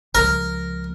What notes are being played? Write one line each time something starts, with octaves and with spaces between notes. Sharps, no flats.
C#2 F3 A#4